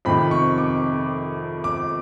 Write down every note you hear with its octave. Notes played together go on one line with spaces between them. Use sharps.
F2 C3 D#3 B5
C#6
D6
D6